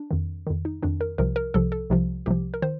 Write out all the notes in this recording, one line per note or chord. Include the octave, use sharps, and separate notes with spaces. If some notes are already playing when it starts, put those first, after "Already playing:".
Already playing: D4
F2 D#3
F2 D#3
D#4
F2 D#3 D4
A#4
C2 C3 F3 A#4
A#4
C2 C3 F3 A4
A4
C2 C3 F3
C2 C3 F3 G4
A#4
D#3 C5